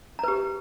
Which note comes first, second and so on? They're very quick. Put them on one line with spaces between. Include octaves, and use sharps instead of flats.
A#5 B4 G4